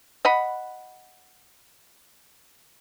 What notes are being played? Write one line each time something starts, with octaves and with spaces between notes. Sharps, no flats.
D#5 F#5 B5